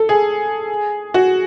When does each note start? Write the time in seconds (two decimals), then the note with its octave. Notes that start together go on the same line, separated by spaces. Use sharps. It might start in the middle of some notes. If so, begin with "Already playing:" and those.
Already playing: A4
0.09 G#4
1.14 F#4